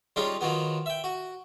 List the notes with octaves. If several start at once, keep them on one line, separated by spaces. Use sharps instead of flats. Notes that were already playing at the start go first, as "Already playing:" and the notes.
G3 G#3 C#4 D#4 F4
D#3 F3 F#3 B3
E5 G5
F#4